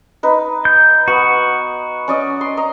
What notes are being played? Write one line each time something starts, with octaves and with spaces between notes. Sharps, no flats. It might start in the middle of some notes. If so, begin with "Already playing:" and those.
D#4 B4
G6
B3 F#4
C#4 D5 D#5
C6
D#5 A#5